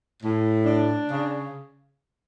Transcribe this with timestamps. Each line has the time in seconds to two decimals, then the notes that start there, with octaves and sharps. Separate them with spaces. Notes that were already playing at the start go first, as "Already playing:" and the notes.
0.23 A2
0.65 D4
1.09 C#3